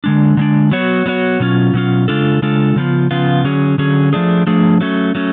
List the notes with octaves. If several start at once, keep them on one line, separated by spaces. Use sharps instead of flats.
D3 G#3 D4
D3 G#3 D4
F#3 B3 F#4 C#5
F#3 B3 F#4 C#5
B2 F#3 C#4 F4
B2 F#3 C#4 F4
C#3 G#3 D4 F4 A4
C#3 G#3 D4 F4 A4
C#3 F3 B3 F4
C#3 F3 B3 F4
D3 F#3 C#4 G#4
D3 F#3 C#4 G#4
F3 A3 D4 G#4
F3 A3 D4 G#4
F#3 A3 C#4
F#3 A3 C#4